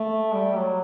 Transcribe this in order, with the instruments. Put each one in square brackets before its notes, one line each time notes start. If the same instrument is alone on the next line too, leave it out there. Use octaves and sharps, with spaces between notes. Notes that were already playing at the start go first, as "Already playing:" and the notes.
Already playing: [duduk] A3
G3
F#3